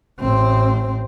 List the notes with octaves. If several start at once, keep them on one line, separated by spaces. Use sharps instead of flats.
A1 C4